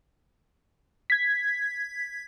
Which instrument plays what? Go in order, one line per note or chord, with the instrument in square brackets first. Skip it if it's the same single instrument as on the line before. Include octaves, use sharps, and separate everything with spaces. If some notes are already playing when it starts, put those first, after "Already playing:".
[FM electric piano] G#6 B6